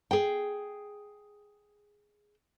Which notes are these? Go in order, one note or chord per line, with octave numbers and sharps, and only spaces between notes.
G#4 G5